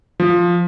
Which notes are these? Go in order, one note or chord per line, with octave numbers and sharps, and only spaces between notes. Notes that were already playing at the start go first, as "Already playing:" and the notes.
F3